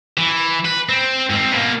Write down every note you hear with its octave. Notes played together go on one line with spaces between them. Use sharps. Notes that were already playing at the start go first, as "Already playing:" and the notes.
E3
B4
C4
G#2 C4
B2 A#3